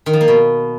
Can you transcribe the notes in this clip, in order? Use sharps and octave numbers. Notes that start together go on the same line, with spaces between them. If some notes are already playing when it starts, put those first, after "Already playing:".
D#3
F3
A#3
B2